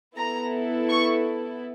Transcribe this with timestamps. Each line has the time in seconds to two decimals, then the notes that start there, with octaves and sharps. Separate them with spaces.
0.16 B3 E4 A4 A#5
0.89 C#6